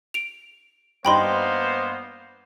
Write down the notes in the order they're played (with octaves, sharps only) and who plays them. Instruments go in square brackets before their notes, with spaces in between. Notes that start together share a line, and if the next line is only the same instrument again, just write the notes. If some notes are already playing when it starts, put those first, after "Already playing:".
[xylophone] D7 F7
[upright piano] G2 D#4 [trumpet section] A#3 B3 C5 [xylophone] G5 B5 C6